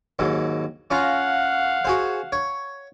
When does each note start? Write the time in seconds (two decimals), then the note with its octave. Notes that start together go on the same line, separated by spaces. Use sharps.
0.19 D#2 G#2 F#3
0.91 C#4 F4 F5 F#5 A#5
1.85 F#4 G#4 C5
2.32 C#5